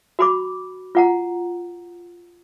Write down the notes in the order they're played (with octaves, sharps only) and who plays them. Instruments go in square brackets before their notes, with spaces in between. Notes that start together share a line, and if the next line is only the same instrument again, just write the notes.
[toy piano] F#4 B5 D6
F4 F#5 A#5